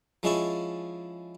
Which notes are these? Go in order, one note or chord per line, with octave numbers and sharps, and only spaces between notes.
F3 G#3 C#4 E4 A5 C#6